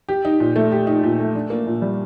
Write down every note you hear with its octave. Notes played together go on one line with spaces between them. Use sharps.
G4
D#4
A#2
A3
G4
D#4
A#2
A3
D4
A#3
A#2
G3